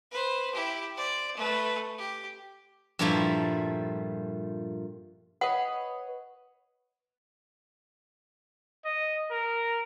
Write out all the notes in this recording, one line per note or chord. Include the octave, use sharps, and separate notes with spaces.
B4 C5
E4 G4
C5 D5
A3 B4
G4
G2 A#2 F3 G3 A3 E4
B4 C#5 D#5 F#5
D#5
A#4